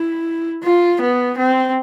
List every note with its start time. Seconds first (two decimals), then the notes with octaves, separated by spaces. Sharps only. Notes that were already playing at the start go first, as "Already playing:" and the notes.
Already playing: E4
0.63 F4
1.01 B3
1.38 C4